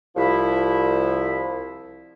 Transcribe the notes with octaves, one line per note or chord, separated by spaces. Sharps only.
C2 F3 E4